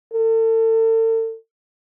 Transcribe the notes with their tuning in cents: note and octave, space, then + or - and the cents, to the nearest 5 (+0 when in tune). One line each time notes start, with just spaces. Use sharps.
A4 +40